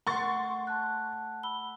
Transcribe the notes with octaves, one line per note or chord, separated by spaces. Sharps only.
A3 F#5 C6 C#6 A6
A5 F#6
B5 E6 G7